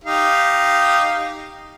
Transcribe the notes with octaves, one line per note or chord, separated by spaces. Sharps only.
D#4 G4 F5